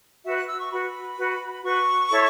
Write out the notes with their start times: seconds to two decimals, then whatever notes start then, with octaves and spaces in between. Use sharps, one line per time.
0.25 F#4 B4 E5
0.36 F#6
0.48 E6
0.59 C#6
0.71 F#4 B4 B5
1.17 F#4 B4
1.63 F#4 B4 C#6
2.10 E4 A4 C#5